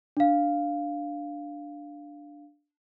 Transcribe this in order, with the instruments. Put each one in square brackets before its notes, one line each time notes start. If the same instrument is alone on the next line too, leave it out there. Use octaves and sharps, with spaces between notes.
[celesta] D4 F5